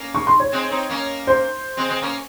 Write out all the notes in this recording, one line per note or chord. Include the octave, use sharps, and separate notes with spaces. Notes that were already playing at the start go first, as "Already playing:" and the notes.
Already playing: A#3 C#4
C#6
C6
C#5
G#3 C4
C4 D#4
A#3 C#4
C5
G#3 C4
G#3 C4
A#3 C#4